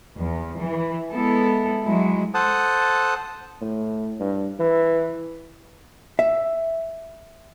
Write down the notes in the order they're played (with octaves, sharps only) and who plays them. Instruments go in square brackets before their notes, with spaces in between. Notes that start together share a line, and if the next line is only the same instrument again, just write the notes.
[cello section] E2
E3
G#3 B3 E4 A4
F#3 G#3 E4
[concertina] A4 C5 F#5 A5 D#6
[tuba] A2
G2
E3
[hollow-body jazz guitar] E5